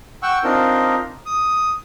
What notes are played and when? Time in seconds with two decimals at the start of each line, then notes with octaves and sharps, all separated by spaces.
0.23 F#5 G5 C#6 E6
0.44 C4 D4 D#4 F4 A#4
1.26 D#6